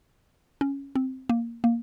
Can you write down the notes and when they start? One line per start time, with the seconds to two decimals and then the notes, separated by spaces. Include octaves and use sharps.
0.61 C#4
0.95 C4
1.29 A#3
1.64 A#3